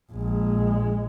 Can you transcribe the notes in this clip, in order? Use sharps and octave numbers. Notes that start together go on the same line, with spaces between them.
A#1 G#3